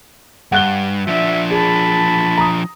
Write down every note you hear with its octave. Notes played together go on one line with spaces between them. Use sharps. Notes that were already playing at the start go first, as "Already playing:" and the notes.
G2 F#5 F#6 G7
F3 D4 E5
G#4 A5 B5
A#5 D#6